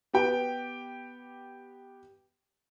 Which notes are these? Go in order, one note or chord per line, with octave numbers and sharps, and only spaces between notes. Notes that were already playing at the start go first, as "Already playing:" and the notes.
B3 G4 G5